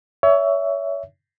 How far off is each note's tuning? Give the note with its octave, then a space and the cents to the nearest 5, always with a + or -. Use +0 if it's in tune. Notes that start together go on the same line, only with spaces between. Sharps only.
C#5 +25 E5 +0